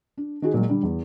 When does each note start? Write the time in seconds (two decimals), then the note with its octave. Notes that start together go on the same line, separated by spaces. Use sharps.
0.17 D4
0.42 D#3 F#4 G#4
0.54 A#2 F#3 G#3
0.68 D3 G3 D4
0.83 E2